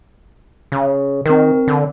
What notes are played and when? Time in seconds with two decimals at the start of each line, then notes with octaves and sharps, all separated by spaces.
0.72 C#3
1.26 D#3 C4 A#4
1.67 D3